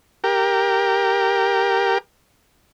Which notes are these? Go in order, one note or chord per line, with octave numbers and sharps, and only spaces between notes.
G4 A#4